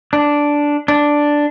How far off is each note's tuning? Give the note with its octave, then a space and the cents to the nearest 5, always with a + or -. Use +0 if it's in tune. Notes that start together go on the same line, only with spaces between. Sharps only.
D4 -5
D4 +0